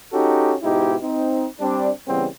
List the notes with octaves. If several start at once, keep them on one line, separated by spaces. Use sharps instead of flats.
C#4 D#4 F#4 G4 A4
G#2 B2 D#4 E4 G4
C4 D#4
G3 C4 D4
C#3 E3 G3 B3 C4